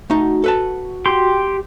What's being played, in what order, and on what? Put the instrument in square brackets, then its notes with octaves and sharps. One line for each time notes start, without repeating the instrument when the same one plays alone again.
[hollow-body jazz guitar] A3 D#4 [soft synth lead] F#4
[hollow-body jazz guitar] A4 B4 A5
[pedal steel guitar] G4 G5 C6